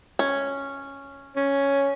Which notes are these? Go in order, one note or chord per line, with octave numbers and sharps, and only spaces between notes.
C#4
C#4